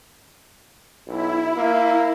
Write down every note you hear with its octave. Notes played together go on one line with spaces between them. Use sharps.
B1 E4
A#3